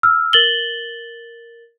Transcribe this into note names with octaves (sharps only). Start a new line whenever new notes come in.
E6 F6
A#4 A6 F#7 G7